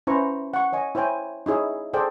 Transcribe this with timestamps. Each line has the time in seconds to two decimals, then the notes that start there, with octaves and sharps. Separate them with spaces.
0.07 C#4 E4 B4 C5 A#5 C#6
0.54 F#5 C#6
0.72 C#5 D#5 G#5 C#6
0.95 E4 C5 C#5 G5 G#5
1.46 D#4 E4 G#4 C#5 E5
1.94 G#4 A4 C5 D5 G5